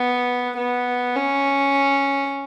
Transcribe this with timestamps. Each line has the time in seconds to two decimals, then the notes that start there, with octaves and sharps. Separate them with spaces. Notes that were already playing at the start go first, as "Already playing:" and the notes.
Already playing: B3
0.58 B3
1.16 C#4